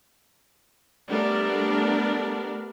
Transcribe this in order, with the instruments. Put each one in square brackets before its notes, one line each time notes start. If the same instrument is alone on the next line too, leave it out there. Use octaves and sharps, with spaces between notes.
[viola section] G3 A3 B3 D4 A#4